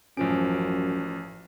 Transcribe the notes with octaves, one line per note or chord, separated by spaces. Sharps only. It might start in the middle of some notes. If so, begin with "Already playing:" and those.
A1 F#2 F3 C#4 D7